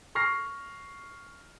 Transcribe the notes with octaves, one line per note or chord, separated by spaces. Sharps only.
C#6 F6 A#6 C7